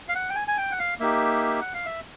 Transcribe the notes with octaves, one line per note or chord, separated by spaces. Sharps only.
F5
F#5
G5
G#5
G#5
G5
F#5
F5
A#3 D#4 G4 E5
F#5
F5
E5